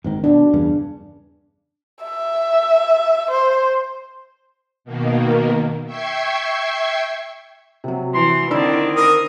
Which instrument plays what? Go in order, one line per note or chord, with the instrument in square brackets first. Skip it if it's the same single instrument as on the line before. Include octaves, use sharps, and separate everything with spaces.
[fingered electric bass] G#1 G#2 D#3
[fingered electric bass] B2 [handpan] D4
[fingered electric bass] E2 G2 C#3
[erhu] E5
C5
[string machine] B2 D#3 A#3
E5 G5 C#6 G#6 C7
[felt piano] C3 F#3
[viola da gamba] E3 [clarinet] C6
[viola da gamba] D3 D#3 C4 [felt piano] D4 E6 [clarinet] E4
[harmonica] A#4 D#6